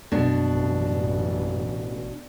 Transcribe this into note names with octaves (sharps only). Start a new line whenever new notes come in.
A#1 F#2 B2 A3 D4
A1